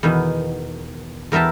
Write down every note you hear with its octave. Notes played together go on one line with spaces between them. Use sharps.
E2 B2 D#3
E2 A#4 E5 G5 A5